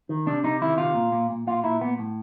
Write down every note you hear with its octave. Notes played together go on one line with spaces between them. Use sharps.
D#3
C3 D4
C3 D#4
D#3 E4
C3 F4
A#2
A#2
A#2
A#2 F4
A#2 E4
A#2 B3
A2